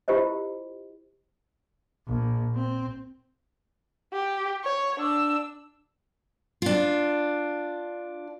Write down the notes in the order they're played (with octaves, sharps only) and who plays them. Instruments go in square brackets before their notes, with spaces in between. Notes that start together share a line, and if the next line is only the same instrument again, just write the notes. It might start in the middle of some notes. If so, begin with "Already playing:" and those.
[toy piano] E4 F4 G4 A#4 C5 D#5
[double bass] A#1
C4
[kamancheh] G4
C#5
D4 E6
[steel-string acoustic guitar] D4 F4